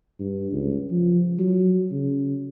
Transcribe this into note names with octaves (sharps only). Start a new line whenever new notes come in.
G2
C#2
F3
F#3
C#3